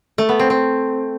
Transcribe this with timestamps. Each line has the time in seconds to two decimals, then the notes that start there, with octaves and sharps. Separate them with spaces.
0.18 A3
0.29 B3
0.39 C4
0.50 C4